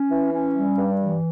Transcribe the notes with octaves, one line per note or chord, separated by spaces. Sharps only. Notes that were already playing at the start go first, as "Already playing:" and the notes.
Already playing: C#4
E3
C#4
G3
G2
E3